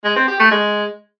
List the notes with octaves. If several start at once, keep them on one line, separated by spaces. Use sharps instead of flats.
G#3
C4
G4
A3
G#3